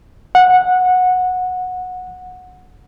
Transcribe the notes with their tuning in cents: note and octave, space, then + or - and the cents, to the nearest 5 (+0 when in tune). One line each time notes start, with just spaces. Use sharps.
F#5 -15